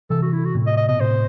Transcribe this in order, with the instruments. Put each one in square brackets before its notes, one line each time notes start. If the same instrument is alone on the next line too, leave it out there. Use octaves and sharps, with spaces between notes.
[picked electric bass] C3 E3 [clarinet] A4
[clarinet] F#4
E4
F#4
[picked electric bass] A2 C3
[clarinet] D#5
D#5
[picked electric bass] B2 [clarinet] D#5
[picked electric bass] A2 C3 [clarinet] C5